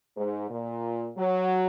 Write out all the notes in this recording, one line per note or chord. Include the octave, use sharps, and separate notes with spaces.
G#2
A#2
F#3